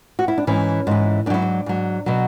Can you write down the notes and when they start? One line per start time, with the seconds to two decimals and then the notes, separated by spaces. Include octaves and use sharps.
0.19 F#4
0.28 E4
0.38 D4
0.47 G#2 E3 C#4
0.87 G#2 E3
1.26 G#2 D4
1.30 F#3 E4
1.42 D4
1.66 G#2 F#3
2.06 B2 F#3